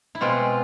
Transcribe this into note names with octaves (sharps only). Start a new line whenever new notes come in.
E4
B2 G#3 C4 F4